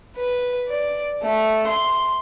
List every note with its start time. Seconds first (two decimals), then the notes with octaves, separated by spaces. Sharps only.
0.17 B4
0.69 D5
1.22 A3
1.67 C6